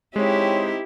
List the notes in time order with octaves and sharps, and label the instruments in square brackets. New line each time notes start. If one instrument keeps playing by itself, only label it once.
[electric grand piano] G#3 [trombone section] C4 D#4 [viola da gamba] E4 G4 [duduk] C#5